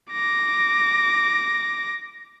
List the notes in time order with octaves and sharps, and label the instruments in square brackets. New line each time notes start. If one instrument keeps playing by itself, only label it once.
[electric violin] D6 A#6